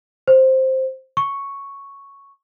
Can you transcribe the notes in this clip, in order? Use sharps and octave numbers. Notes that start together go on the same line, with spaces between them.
C5
C#6